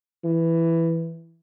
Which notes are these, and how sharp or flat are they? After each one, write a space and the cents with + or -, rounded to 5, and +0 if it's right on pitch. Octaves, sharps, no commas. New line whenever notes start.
E3 +5